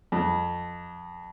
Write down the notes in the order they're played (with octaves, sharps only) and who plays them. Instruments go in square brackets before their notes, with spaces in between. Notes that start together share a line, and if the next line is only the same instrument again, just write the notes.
[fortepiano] F2